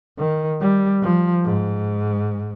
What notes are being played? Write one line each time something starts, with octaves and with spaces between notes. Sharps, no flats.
D#3
G3
F3
G#2